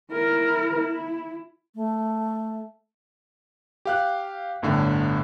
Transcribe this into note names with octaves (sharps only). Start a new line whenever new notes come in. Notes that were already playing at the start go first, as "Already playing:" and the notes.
E4 A#4
E4
A3
G4 F5 F#6
G1 A2 D3